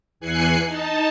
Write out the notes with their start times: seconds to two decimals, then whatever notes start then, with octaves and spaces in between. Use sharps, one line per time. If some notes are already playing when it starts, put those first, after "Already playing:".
0.20 E2 E3 G#5 F#6 C7 C#7
0.65 D#4 A5